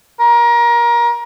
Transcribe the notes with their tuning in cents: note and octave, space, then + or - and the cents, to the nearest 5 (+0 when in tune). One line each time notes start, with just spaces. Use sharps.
A#4 +25